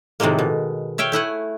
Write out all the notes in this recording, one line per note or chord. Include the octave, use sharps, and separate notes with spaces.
A2 C3 D#3 F3 G#3 A#3
B2
C#5 E5 F5 G5
A3 E4 F#5 G#5